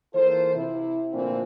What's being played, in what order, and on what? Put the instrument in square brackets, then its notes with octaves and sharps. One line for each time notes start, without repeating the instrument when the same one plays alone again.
[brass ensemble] E3 A#3 F4 A4 C5
C3 E4
A#2 D3 E3 F3 A3 C4